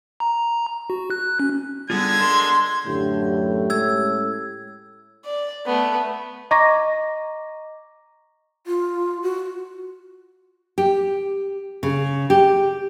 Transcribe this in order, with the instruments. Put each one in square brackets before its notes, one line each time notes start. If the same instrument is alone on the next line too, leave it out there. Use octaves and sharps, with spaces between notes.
[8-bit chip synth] A#5
F#4
F#6
C#4
[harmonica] D3 G#3 [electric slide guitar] G3 B3 F4 [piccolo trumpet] G#6
[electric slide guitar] A4 A#4 [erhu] C6
[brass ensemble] F#2 D3 [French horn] A2 [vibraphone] G4
[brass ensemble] G#3 C#4 A4 [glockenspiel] E6 G#6
[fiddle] D5
A3 B3
[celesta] D#5 A#5 C#6 D6 A#6
[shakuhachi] F4
F#4
[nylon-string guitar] G4
C#3
G4